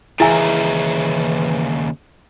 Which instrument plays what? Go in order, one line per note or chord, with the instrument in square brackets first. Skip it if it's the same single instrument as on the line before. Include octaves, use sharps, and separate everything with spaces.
[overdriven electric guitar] D#2 C#3 [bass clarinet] E3 [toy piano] E4 G#5 [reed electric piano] G#4 E5 A#5